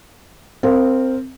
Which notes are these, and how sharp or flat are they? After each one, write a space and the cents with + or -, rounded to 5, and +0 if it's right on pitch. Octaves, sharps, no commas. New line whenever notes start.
C4 +0 A#4 -25 F5 +0